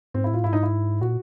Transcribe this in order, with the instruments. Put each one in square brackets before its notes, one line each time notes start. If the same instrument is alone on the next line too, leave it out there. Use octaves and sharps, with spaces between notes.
[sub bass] G#2 [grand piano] C4
[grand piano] E4
[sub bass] A2 [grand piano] F4
[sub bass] G#2 [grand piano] E4
[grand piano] D#4
E4
[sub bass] A#2 [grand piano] F#4